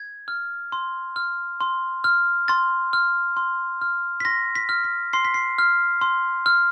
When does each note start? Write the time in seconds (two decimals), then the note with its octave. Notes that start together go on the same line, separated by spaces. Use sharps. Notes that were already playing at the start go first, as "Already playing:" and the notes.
Already playing: G#6
0.28 F6
0.72 C6
1.16 F6
1.61 C6
2.04 F6
2.48 C6 A6
2.93 F6
3.37 C6
3.81 F6
4.20 B6
4.25 C6 A#6
4.55 B6
4.69 F6
4.84 B6
5.13 C6 C7
5.25 B6
5.34 C7
5.58 F6
6.01 C6
6.46 F6